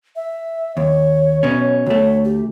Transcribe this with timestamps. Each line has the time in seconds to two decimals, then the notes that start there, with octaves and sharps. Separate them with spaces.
0.16 E5
0.77 D#2 C#5
1.43 B2 C#4
1.86 D2 A3 C#5
2.25 G4